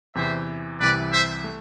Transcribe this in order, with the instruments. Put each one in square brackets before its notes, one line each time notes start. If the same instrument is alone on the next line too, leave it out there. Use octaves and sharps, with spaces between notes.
[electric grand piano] E2 C3 E3 [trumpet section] C5 E5
[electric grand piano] C2 C3 E3 [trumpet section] B4 D5
[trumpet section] C5 E5
[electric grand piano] A3